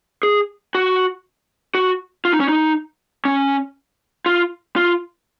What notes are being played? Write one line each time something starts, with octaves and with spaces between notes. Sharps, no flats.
G#4
F#4
F#4
F4
D#4
C#4
D#4
C#4
F4
F4